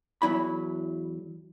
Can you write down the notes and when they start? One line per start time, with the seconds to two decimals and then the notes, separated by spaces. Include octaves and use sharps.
0.22 E2 F#3 E4 B5